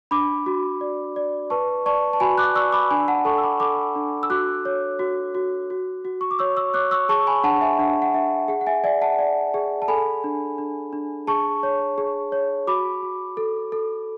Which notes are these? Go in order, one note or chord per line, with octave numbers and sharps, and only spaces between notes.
D4 B5 D6
F#4
D5
D5
B4 A5 C#6
D5 A5 C#6
A5
F#4 G#5 B5
D6 F#6
D5 C#6 E6
B5 D6
D4 G#5 B5
F#5 A5
A4 A5 C#6
E6
B5 D6
A4 B5 D6
D4
E6
F#4 D6 F#6
C#5
F#4
F#4
F#4
F#4
C#6
D6
C#5 C#6 E6
C#6 E6
C#5 D6 F#6
C#6 E6
G#4 A5 C#6
G#5 B5
D4 F#5 A5
E5 G#5
D4 F#5
F#5
D4 E5
G#4 F#5
F#5
E5 G#5
D5 E5 G#5
F#5 A5
D5
G#4
A5
A4 G#5 B5
D4
D4
D4
G#4 A5 C#6
C#5
G#4
C#5
F#4 B5 D6
F#4
A4
A4